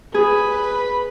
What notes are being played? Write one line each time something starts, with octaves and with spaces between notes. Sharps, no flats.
G#4 B4